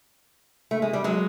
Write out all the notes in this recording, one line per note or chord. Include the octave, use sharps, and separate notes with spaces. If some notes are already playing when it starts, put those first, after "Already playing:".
A3
G#3
G3
F#3 G#3